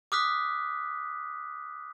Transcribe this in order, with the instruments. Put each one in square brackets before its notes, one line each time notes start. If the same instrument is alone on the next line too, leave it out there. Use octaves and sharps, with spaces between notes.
[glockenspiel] D6 D#6 F6 F#6 B6